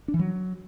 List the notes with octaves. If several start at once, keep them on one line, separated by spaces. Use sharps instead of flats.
D4
E3
F#3